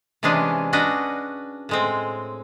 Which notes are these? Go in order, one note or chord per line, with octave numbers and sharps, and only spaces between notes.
C3 E3 G#3 C#4 D4 G#4
C#4 D4 F#4 B4 D#5
A2 G#3 C4